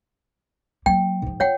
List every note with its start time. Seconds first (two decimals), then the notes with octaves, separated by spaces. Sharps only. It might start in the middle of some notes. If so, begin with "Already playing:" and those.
0.86 F#3 A#3 G5
1.22 G#2 F3
1.40 F4 C#5 F#5 G5